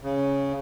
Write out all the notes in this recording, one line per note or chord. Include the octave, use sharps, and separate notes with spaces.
C#3